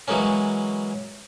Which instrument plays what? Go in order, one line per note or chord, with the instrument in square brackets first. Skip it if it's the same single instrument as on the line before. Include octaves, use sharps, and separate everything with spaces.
[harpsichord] E3 F#3 G#3 A#3 C#4